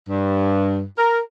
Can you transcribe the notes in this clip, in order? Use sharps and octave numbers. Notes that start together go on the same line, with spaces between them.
G2
A#4